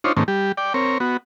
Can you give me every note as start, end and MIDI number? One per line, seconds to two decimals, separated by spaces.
0.04 0.12 62
0.04 0.12 63
0.04 0.12 65
0.04 0.12 72
0.04 0.12 73
0.17 0.23 44
0.17 0.23 51
0.17 0.23 57
0.17 0.23 58
0.17 0.23 60
0.17 0.23 61
0.28 0.52 55
0.28 0.52 67
0.57 0.73 74
0.57 0.73 79
0.74 0.98 60
0.74 0.98 70
0.74 0.98 73
1.00 1.17 59
1.00 1.17 66